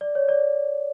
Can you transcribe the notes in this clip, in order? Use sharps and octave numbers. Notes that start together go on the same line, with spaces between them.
D5
C#5
D5